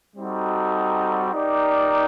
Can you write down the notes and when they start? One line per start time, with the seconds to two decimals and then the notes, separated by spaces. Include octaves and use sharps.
0.16 G3 C4 D#4 F#4 A4
1.33 D#4 G4 A#4 D5